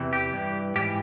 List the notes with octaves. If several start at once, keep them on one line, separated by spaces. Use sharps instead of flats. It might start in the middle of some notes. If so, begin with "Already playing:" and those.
Already playing: E2 C3 E3
G4
G2 E3
G#2 E3 G4